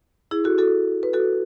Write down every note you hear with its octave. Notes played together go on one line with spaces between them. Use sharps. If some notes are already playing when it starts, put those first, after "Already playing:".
E4 G#4
F#4 A4
F#4 A4
B4
F#4 A4